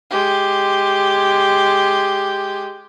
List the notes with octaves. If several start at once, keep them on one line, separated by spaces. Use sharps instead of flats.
G#3 G4